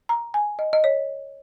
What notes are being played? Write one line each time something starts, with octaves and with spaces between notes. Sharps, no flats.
A#5
G#5
D#5
D#5
C#5